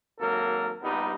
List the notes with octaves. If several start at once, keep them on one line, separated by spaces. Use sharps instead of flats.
G#1 F#3 A#3 A4 A#4
A#1 G2 G3 B3 D#4